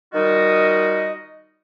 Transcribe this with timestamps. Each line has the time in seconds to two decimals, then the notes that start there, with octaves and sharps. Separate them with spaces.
0.14 D#3 G3 D#4 F4 F#4 D#5